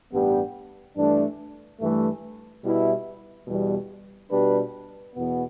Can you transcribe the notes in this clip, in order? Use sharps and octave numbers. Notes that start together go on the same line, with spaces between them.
A1 G2 G3 B3 G4
G2 E3 A3 D4
G2 E3 A3
B2 G3 E4 B4
E2 B2 G3
B2 G3 D4 G4 B4
E2 B2 B3